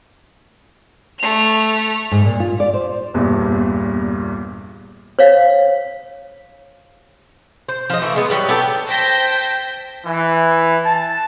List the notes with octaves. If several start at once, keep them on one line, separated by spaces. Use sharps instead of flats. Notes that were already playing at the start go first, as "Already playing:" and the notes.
A3 F7
G#2
A#2
F4
D5
C5
G1 E2 G2 A#2
C5 C#5 F5
C5
F3 D#5
E3 A3
G#3 B3
F#3 G3 B4
B3 G4 A4
C5 G5 A5 G6 A#6 B6
E3
A5